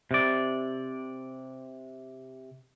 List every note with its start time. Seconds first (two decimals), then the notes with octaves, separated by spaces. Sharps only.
0.11 C3 D5